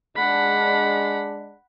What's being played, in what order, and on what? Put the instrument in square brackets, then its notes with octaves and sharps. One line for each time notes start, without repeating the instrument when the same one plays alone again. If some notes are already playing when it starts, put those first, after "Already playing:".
[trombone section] G#3 D4 [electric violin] F#5 B5